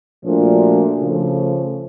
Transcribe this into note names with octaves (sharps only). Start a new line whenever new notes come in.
A#2 F3 A3 D4 F#4
C#3 F3 A3